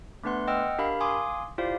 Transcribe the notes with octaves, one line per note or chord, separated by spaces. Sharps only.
A3 B3 D4 B4 F#5 C6
D#5 F#5 G5 E6 F6
D4 G4 A#4 F5 B5
F5 G#5 C6 D6 D#6
E4 F4 G4 C5 D5 F5